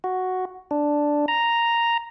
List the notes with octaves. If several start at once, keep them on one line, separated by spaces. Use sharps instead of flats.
F#4
D4
A#5